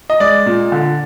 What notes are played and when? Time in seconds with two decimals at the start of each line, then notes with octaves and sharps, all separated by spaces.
0.10 D#5
0.20 G#3 D5
0.46 A#2
0.72 D3